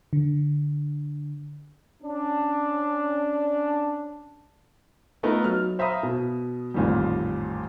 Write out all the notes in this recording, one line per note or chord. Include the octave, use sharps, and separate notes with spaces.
D3
C#4 D4
A3 B3 D#4 F4 A4 A#4
F#3 F6
C5 E5 F5 A#5 B5 D#6
B2
A1 F2 A#2 D#3 G3